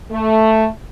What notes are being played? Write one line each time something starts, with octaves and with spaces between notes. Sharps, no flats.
A3